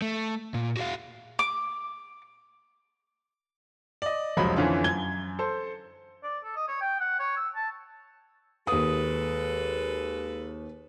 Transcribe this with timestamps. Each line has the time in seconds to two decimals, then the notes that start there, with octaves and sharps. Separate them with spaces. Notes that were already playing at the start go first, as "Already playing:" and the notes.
0.02 A3
0.54 A#2
0.77 F#4 G#4 D#5 F5
1.39 D6
4.02 D5 D#5
4.37 F1 C#2 F3 F#3 D#5 B5
4.56 F2 D3 E3 C#4 F4
4.84 F#2 G#6 G7
5.39 A4 C5
6.23 D5
6.44 A4
6.56 D#5
6.68 C#5
6.81 G5
7.00 F#5
7.19 C#5
7.37 E6
7.55 A5
8.67 D#2 G#3 A4 B4 D#6